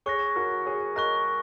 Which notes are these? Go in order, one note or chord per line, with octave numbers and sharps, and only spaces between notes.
G#4 C#5 C#6 F#6 A#6
F#4 A#4
G#4 C#5
A#4 D#5 C#6 F#6 A#6